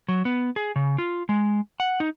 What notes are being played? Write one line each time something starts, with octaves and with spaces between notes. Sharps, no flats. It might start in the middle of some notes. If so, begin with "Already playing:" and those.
F#3
B3
G#4
C#3
F4
G#3
F#5
D#4